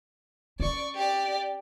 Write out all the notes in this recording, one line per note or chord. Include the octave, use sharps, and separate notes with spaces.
C#4 D5 C#6
G4 D5